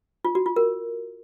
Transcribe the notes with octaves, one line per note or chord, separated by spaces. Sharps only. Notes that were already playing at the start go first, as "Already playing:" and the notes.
F4
F#4
F4
A#4